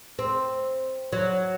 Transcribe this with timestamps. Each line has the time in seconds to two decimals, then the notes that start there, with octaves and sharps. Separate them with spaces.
0.19 C4
1.12 F#3